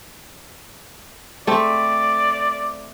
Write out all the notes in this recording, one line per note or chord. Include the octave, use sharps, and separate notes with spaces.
A3 C4 D5